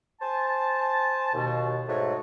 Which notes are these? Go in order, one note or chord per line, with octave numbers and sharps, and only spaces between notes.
C5 G#5 A5
D#2 B2
G#2 A3 F#4 C#5